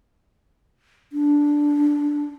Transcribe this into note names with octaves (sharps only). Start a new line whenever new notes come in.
D4